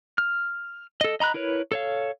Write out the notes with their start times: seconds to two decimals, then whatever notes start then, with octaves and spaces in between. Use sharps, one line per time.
0.18 F6
1.01 A4 D#5
1.20 D#5 A#5 B5 F#6
1.34 E4 A#4 B4 C#5
1.72 A4 C#5 F5